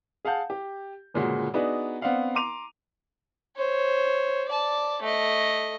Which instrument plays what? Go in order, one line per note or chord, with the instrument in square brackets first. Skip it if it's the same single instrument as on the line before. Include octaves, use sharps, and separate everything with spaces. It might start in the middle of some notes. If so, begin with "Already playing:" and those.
[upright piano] G#4 F5 F#5 A5 G6
G4
G1 A#2 C#3 G#3 F#4
B3 D4 D#4 F#4 G#4 B4
B3 C4 D4 F5 F#5
A#5 C6 D6 D#7 F7
[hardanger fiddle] C5 C#5
D5 A5
A3 D#5